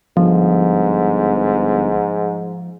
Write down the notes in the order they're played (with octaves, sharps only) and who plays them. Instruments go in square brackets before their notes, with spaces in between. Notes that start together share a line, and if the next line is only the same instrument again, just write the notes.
[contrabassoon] G1 [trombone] G#2 [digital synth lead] F3